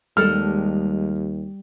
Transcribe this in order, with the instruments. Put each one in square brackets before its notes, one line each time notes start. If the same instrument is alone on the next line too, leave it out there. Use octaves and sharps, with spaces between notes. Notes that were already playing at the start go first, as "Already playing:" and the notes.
[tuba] D#2 [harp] G3 [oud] G#3 A4 [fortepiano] F6